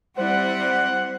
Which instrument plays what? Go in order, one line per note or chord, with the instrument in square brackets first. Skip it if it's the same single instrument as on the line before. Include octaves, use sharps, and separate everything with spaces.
[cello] G3 C4 [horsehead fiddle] E4 D5 [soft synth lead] C5 [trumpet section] F#5